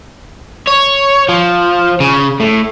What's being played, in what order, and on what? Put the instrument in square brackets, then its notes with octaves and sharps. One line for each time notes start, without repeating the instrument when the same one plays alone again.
[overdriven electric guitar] C#5
F3
C#3
A2